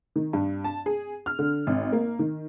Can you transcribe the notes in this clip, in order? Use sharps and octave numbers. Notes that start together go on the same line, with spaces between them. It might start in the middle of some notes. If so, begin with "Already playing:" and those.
D#3
G2
A5
G#4
F6
D3
G#1
A#3
D#3